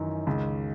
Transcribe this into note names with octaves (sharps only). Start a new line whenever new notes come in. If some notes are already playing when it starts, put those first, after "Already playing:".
Already playing: F#2 D#3 E3
C#2